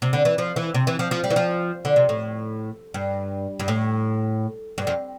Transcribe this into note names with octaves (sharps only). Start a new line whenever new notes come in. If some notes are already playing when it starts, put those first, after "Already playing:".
C3
D3
E3
F3
E3
C3
E3
F3
F3
G3
E3
F3
D3
C3
A2
G2
G2
A2
G2
F2